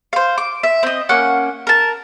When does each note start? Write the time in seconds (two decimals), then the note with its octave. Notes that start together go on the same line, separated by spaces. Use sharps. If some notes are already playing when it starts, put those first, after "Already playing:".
0.13 C5 F5
0.38 D6
0.63 E5
0.83 C4 D#5
1.09 A#3 C#4 F#5
1.67 A#4 A5